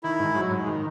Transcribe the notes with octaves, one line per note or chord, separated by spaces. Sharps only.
D#3 E4
G#2
F#3
G#2
D#3